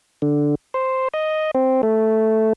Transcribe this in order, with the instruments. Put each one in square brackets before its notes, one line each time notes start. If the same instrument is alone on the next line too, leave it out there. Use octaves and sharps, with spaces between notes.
[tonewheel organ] D3
C5
D#5
C4
A3